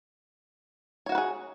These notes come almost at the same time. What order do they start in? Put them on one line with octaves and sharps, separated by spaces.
C#5 F#4 F#5 B4 G#4